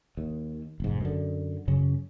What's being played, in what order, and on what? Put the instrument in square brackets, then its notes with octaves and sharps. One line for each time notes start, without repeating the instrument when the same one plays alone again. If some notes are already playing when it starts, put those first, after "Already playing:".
[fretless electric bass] D#2
F1 G#2
F#2 D3
F#2 C#3 C#4